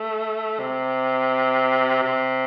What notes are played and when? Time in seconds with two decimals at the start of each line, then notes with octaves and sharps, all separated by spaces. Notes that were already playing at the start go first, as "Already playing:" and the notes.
Already playing: A3
0.59 C3
2.03 C3